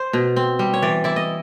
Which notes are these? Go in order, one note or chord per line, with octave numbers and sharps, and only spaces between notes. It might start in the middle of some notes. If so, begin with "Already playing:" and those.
Already playing: C5
B2
C4
G3
C#5
E3 D5
E4 D5
D#5